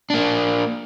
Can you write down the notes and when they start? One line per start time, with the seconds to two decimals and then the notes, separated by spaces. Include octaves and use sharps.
0.10 A#3 D4